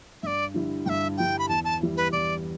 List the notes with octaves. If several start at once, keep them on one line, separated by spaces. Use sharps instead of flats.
G2 D5 E5
D3 G3 E4
G2 E5 G5
D3 G3 E4 G5
B5
E2 A5
A5
E3 G3 E4
B4
E2 D5